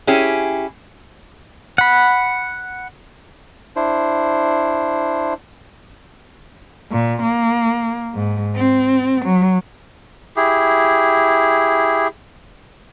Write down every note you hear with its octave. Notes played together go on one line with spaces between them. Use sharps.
C#4 E4 G4 G#4
F#5 B5
D4 E4 C5
A#2
A#3
G#2
C4
F#3
E4 G4 G#4